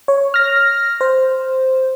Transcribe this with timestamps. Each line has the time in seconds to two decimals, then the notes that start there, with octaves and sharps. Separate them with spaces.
0.08 C#5
0.34 F6 A#6
1.01 C5